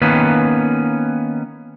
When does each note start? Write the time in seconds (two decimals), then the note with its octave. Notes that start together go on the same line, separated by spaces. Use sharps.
0.02 D#3 A#3 B3 C#4 B4